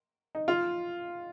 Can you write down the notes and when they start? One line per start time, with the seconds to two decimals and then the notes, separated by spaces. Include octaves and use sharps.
0.35 D#4
0.48 F4